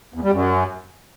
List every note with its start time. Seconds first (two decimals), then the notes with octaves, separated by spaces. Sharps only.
0.14 E2
0.23 G3
0.32 F#2